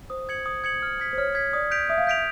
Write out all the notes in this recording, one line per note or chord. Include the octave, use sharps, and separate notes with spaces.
C5 D#6
G#6 C#7 F#7
D#6
G#6 C#7 F#7
F6
G#6 B6
C5
C#5 F6
G#6 B6
D5 D#6
G6 B6 D7 F7
E5 D#6
F5
E5 G6 B6 D7 F7